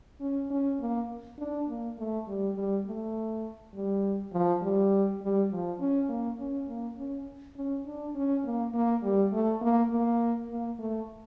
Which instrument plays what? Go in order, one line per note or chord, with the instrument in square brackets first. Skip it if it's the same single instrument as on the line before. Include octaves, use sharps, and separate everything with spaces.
[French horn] C#4
C#4
A#3
D4
A#3
A3
G3
G3
A3
G3
F3
G3
G3
F3
C#4
A#3
C#4
A#3
C#4
C#4
D4
C#4
A#3
A#3
G3
A3
A#3
A#3
A#3
A3